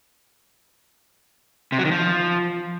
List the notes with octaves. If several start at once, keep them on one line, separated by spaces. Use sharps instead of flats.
C3
F#3
D#3
F3